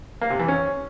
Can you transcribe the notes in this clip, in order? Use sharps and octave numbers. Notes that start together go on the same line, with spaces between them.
A#3
C3
E3
C#4